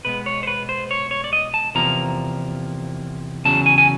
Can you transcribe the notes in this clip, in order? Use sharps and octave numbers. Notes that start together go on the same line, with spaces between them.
B2 G#3 B3 B4
C#5
C5
B4
C5
C#5
C#5
D5
D#5
A5
E2 C3 F3 A#3 A#5
E2 C#3 F#3 A5
G#5
G#5